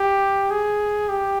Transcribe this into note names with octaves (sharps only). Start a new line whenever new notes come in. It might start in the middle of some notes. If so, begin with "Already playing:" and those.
Already playing: G4
G#4
G4